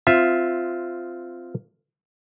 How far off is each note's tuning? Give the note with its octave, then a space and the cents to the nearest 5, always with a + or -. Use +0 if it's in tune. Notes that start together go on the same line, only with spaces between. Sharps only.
C4 -10 F4 +0 E5 +5